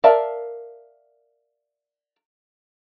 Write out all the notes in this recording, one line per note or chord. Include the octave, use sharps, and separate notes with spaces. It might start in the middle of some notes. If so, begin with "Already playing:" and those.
A#4 D5 E5 F5 A5